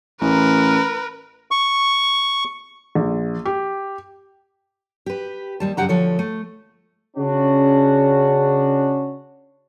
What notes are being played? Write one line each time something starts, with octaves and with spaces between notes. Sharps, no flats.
A1 A#4 B4
C#6
A#1
G4
G4 B4
D#2 G3 A5
F#2 C#3 G4 F#5 A#5
D2 F3 A4 C#5
A3
C#3 C#4 D4 F#4